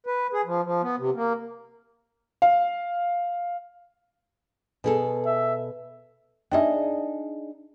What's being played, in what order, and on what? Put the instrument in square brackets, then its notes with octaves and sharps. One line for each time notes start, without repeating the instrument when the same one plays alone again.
[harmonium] B4
G#4
F3
F3
B3
C3
A#3
[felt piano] F5
[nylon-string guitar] B2 G#4 A4
[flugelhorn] E5
[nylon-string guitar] D4 D#4 G#4 [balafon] E5 G5